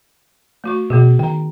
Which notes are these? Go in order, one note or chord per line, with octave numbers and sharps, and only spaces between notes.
A3 F#4 C#6
B2 B3 F#4 G#4
D#3 G5 A#5